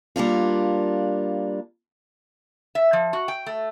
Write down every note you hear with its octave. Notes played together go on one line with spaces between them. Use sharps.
G3 A#3 D4 F4
E5
F3
F#4
G5
A3